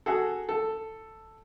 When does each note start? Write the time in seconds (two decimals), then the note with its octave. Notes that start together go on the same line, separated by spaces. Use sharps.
0.06 F#4 G#4 A4
0.49 A4